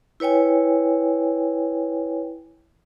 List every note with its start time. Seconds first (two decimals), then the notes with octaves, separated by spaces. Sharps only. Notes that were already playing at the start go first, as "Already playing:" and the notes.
0.20 E4 B4 C#5 G5 G#5